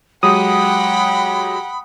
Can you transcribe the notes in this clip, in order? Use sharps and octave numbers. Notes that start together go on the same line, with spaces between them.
F#3 G#3 G4 F#5 G5 B5 D#6